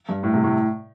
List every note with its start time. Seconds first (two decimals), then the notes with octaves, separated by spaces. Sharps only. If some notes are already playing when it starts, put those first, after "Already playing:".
0.09 G2
0.23 A2
0.34 C3
0.44 A2